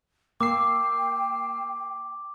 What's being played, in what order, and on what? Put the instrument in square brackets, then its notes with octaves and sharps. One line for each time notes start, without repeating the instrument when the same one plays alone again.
[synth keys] A#3 E6 C7 [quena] G5 [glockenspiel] D6